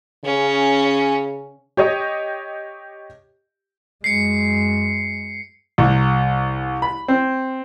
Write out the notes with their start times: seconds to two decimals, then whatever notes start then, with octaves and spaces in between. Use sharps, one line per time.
0.25 C#3 C#4
1.77 G4 C#5 D#5
4.04 F#2 G#3 C7 C#7
5.78 C2
6.82 B5
7.08 C4